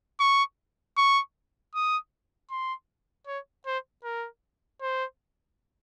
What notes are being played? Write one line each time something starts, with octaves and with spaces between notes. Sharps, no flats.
C#6
C#6
D#6
C6
C#5
C5
A#4
C5